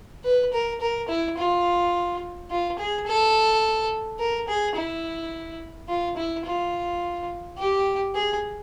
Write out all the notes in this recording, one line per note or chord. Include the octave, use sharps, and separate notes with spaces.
B4
A#4
A#4
E4
F4
F4
G#4
A4
A#4
G#4
E4
F4
E4
F4
G4
G#4